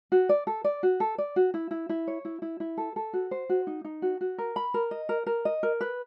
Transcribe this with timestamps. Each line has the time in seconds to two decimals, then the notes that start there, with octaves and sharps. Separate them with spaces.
0.12 F#4
0.29 D5
0.47 A4
0.64 D5
0.83 F#4
1.00 A4
1.18 D5
1.36 F#4
1.54 E4
1.71 E4
1.89 E4
2.07 C#5
2.25 E4
2.42 E4
2.60 E4
2.78 A4
2.96 A4
3.13 F#4
3.31 C5
3.49 F#4
3.67 D#4
3.84 D#4
4.02 F#4
4.21 F#4
4.38 A#4
4.56 B5
4.74 A#4
4.91 D#5
5.09 A#4
5.27 A#4
5.45 D#5
5.63 A#4
5.81 B4